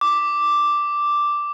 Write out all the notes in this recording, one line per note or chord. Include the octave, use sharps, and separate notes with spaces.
D6